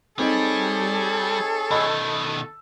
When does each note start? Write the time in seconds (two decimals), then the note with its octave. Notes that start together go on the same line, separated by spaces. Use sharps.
0.19 G3 C4 D#4 G#4 A4 C#5
1.71 B2 D#3 D#5 B5 E6